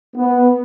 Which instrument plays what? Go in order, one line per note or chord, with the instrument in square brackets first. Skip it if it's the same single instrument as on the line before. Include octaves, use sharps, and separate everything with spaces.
[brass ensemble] B3